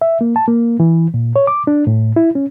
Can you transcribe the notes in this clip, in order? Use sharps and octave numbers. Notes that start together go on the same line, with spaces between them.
E5
A#3
A5
A#3
E3
A#2
C#5
D6
D4
A2
E4
C#4